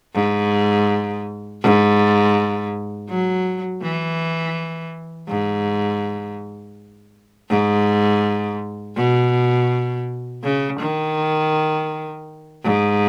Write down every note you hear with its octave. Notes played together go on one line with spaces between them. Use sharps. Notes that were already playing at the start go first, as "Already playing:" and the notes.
G#2
G#2
F#3
E3
G#2
G#2
B2
C#3
D#3
G#2